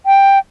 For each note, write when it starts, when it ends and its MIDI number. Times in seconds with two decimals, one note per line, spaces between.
0.06 0.39 79